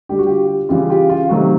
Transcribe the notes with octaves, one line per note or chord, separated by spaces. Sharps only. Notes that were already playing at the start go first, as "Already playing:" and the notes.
D3 G3 G4
F#4
F4 G4
C#3 E3 G3 F4 G4
F4 G4
F4
C3 D#3 F#3 A3 F#4